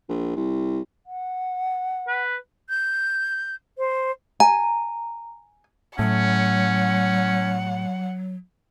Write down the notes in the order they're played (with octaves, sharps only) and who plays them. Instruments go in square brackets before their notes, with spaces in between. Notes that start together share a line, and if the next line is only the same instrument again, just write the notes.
[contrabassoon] A#1
C2
[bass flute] F#5
[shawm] B4
[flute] G6
C5
[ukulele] G#5 [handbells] A#5
[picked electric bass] A2 [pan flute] F#3 [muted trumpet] C#4 [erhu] F#5